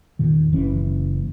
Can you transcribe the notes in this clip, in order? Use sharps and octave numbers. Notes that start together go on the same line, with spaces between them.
E2 A#2 D#3
F#1 E3 C#4